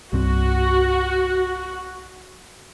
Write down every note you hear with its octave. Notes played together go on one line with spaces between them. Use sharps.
C2 G2 C4 F#4